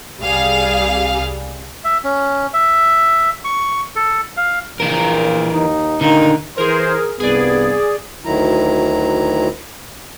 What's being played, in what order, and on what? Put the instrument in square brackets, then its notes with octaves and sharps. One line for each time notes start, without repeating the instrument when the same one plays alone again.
[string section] C2 G3 G#4 F5
[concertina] E5
C#4
E5
C#6
A4
F5
[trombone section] A#1 A#2 [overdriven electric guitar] E3 A#4
[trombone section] D#2 D#4
[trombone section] A1 A#2 D#3 [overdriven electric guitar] D3 [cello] D#4
[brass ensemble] E3 C5 [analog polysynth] G#4 A#4
[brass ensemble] C2 G2 B3 [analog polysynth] G#4 D5
[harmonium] D2 D#3 F#3 E4 A#5